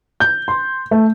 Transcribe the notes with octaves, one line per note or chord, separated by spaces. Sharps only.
G6
C6
A3